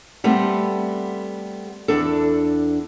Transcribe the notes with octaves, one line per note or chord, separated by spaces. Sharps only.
G3 A3 B3 C4
E2 D4 A4